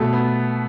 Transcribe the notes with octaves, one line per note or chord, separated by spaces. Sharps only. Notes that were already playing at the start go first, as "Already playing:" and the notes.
Already playing: B2 A3
B3